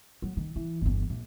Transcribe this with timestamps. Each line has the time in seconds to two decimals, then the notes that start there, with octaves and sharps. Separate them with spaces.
0.22 F#3
0.37 D#3
0.56 E3
0.81 G1 E2
1.10 A#1